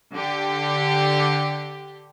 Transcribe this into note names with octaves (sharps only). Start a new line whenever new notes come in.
D3 G4